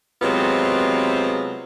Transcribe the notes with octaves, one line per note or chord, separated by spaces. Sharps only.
C3 F#3 G#3 B3 C4 F4